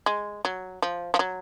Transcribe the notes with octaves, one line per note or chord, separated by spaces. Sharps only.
G#3
F#3
F3
F3
F#3